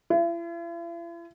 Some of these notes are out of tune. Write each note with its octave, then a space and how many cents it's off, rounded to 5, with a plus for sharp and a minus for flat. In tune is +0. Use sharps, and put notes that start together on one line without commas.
E4 +45